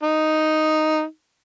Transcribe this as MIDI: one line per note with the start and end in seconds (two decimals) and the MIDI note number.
0.03 1.02 63